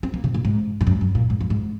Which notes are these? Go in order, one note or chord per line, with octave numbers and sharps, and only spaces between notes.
C4
A#3
C3
A#2
G#2
G#2
F#2
F#2
A#2
G#2
F#2
G#2